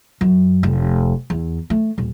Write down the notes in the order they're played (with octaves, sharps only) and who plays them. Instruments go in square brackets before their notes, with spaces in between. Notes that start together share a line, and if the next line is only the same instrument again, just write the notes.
[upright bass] F#2
F1
E2
A3
D#1